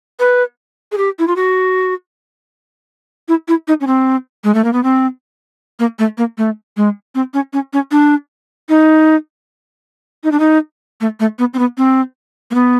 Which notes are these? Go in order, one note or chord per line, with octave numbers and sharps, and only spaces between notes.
B4
G#4
G4
E4
F4
F#4
E4
E4
D#4
C#4
C4
G#3
A3
A#3
B3
C4
A#3
A3
A#3
A3
G#3
C4
C#4
C#4
C#4
D4
D#4
D#4
D4
D#4
A3
A3
B3
C4
B3
C4
A#3
B3